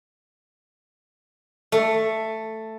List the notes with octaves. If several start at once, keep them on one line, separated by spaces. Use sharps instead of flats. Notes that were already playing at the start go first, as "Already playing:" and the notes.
A3